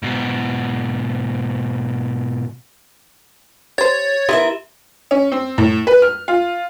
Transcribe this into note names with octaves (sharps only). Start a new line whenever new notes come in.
G#2 B2
G4 C5 C#5 A6
D#3 B3 E4 G4 A#4 E5
C#4
C4
A2
B4
F6
F4